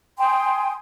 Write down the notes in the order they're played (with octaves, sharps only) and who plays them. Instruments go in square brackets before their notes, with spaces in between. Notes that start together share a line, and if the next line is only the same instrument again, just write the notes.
[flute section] G5 G#5 C6 D#6